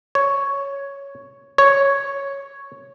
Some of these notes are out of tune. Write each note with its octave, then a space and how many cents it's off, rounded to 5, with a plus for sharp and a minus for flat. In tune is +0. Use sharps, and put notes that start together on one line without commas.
C#5 +5
C#5 +0